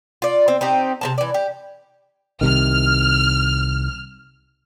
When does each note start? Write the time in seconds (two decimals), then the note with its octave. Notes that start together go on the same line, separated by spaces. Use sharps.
0.22 F4 D5
0.48 C4
0.61 C4 D#4 G4
1.01 C3 A#3 A5
1.18 E3 D5
1.34 G4
2.41 C2 C3 D#3 F6